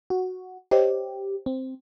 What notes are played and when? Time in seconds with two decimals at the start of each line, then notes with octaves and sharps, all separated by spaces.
0.10 F#4
0.71 G4 C5 C#5 D#5
1.46 C4